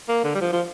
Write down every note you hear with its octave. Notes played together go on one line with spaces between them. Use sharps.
A#3
D3
G3
F3
F3